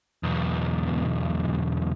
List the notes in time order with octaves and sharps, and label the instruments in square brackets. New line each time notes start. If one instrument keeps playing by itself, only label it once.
[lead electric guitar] B1 E2